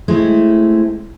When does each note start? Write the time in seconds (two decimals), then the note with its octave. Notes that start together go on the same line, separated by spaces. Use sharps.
0.08 G#3 A3 C4 E4